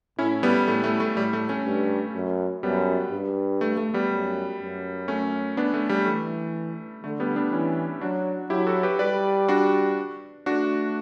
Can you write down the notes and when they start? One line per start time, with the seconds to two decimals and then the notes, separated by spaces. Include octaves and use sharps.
0.18 A2 C#4 E4
0.43 G3 B3
0.67 A2 A3
0.84 A3
1.00 A3
1.17 A2 G3
1.33 A3
1.49 A3 C#4
1.65 G2
2.14 F#2
2.63 F#2 G3 B3
3.12 G2
3.61 A3
3.77 A3
3.94 G3 B3
4.11 F#2
4.59 F#2
5.08 A3 C#4
5.57 B3 D4
5.74 A3
5.89 G3
6.05 E3 A3
7.03 D3 A3
7.20 G3 B3
7.36 B3 D4
7.52 E3 C#4 E4
8.01 F#3 D4 F#4
8.50 F#3 E4 G4
8.66 F#4 A4
8.83 G4 B4
8.99 G3 B4 D5
9.48 D4 F#4
10.46 A3 D4 F#4